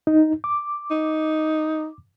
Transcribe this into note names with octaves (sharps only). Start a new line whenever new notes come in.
D#4
D6
D#4